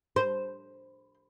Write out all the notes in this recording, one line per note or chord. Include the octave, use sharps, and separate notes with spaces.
C5